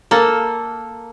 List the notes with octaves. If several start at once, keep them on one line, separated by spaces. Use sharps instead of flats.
A#3 A4